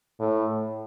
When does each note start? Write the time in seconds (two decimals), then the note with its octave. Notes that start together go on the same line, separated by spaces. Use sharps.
0.20 A2